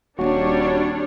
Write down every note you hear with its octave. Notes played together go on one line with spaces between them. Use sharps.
D#1 G3 D4 F#4 C#5